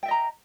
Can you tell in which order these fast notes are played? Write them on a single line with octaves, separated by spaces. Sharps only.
G5 E5 D#5 A#5